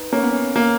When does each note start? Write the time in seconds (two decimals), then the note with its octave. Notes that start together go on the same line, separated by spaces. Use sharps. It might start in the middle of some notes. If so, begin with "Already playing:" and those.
Already playing: D#4 B4
0.12 A#3 C#4
0.22 B3
0.32 C#4
0.56 A#3